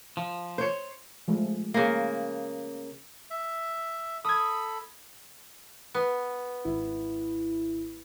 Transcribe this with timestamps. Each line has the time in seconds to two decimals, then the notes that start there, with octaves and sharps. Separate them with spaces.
0.17 F3
0.58 C5 C#5
1.28 F3 G#3 A3
1.74 C#3 A#3
3.30 E5
4.24 A4 B5 D#6 G#6
5.95 B3
6.65 G#1 E4